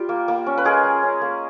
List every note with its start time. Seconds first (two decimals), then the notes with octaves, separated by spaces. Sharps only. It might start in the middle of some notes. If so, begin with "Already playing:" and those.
Already playing: G3 F4 G4
0.09 A#3
0.28 A#3
0.46 C#4
0.58 B4
0.65 G#3 G#4 A#4
0.84 G#3
1.03 C#4
1.22 A#3